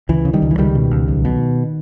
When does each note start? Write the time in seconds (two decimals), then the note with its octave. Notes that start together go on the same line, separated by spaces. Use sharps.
0.09 C#2 E3
0.25 C#3
0.33 D#3 G3
0.42 C#2
0.51 E3
0.58 C#2 D#3 G3
0.75 B2
0.91 C#2
1.08 B1
1.25 B2